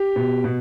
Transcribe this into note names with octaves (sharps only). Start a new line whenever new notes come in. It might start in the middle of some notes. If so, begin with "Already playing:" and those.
Already playing: G4
B2
B2